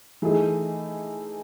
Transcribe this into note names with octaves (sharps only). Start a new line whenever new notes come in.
E3 A3 D#4 G#4